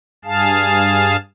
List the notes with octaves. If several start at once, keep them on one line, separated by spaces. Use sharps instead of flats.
G2 G#4 F5 A5